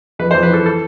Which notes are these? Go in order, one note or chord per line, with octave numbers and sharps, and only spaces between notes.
F2 B4
C5
F2
B4
E3 A4
A4